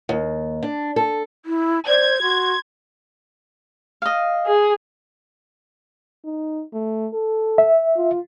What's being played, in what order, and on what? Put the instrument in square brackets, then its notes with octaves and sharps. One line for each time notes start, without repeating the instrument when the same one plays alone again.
[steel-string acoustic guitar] D#2
D4
A4
[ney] E4
[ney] C5 [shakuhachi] D5 [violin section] G#6
[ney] F#4 [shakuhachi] C6
[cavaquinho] D#5 F5
[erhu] G#4
[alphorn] D#4
A3
A4
[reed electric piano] E5
[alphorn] F4